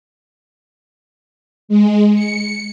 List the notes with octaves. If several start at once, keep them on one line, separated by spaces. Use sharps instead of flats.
G#3
C#7